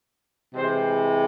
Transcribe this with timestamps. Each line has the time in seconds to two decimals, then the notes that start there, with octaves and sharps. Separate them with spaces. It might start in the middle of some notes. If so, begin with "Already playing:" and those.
0.55 C3 E3 G#3 C5